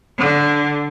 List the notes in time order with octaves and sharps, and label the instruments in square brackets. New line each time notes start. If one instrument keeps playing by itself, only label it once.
[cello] D3